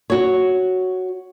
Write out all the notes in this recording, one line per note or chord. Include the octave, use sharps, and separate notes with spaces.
F#4 C#5